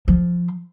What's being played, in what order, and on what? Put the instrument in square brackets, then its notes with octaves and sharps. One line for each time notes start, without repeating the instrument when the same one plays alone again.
[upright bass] F3